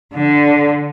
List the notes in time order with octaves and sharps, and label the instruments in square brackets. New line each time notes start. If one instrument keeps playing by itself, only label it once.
[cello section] D3